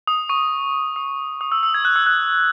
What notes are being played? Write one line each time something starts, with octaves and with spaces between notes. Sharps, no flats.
D#6
C#6
D#6
D#6
E6
E6
G#6
F#6
E6
F#6